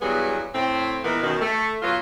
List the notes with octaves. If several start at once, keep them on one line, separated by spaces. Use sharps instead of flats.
E2 G2 F#3 B3 G#4
A2 C4
A#2 E3 G#3 A#3 B3
F#2 B2 D#3
A3
B2 F#3 B3 F4